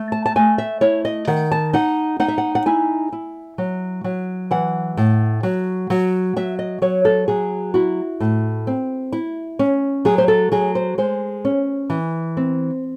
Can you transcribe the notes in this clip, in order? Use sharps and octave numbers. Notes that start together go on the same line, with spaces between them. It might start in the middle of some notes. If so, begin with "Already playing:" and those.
Already playing: A3
A5
A5
A3 G#5
E5
E4 C#5
D#5
D#3 F#5
A5
D#4 F#5
D#4 F#5
E5
F#5
F#5
E4 G#5
E4
F#3
F#3
E3 F#5
A2
F#3
F#3
F#3 E5
D#5
F#3 C#5
A4
F#3 G#4
E4 F#4
A2
C4
E4
C#4
F#3 G#4
C5
A4
F#3 G#4
C5
G#3 C5
C#4
E3
C4